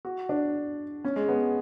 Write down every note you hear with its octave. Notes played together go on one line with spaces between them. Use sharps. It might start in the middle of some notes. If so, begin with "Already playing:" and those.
F#4
D4
C#4
G#3
B3